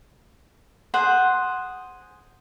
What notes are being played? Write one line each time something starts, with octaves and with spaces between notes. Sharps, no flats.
G#4 C5 F#5